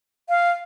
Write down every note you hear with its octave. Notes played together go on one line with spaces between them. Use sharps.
F5